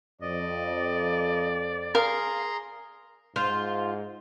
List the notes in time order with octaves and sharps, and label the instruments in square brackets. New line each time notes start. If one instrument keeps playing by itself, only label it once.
[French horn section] F2 [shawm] D5 [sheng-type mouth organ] D#5
[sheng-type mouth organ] G#4 A#5 C6 [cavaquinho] A#4 F5
[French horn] G#2 [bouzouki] F4 [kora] C5